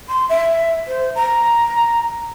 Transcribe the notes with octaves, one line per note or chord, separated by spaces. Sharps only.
C6
E5
C5
A#5